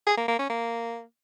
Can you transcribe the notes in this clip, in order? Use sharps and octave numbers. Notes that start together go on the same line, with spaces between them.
G#4
A#3
A#3
C#4
A#3